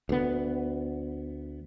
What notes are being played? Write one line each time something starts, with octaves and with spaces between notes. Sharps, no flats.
D2 B3